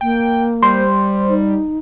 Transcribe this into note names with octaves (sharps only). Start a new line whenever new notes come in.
A#3 G5
G3 C5
D#4